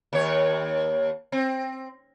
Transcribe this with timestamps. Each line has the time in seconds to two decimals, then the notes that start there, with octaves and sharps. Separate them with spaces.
0.13 D#2 C#5
1.32 C4